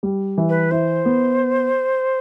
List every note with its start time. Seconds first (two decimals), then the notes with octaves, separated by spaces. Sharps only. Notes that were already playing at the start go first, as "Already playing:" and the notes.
0.03 G3
0.38 E3
0.49 B4
0.71 E4 C5
1.05 B3